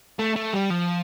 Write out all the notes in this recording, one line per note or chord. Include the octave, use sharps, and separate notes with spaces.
A3
A3
G3
F3